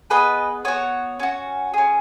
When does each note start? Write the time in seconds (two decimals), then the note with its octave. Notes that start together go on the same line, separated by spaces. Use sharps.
0.10 B3 G#4 B4 D#5
0.65 B3 F#4 C#5
1.19 C#4 F#4
1.74 C#4 G#4